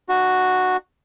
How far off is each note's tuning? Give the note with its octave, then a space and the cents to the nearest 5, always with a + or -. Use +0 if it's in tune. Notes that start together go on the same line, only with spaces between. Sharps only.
D4 +45 F#4 -5